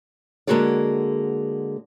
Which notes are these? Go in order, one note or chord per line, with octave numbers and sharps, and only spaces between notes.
D3 G#3 A#3 F#4 G#4 D5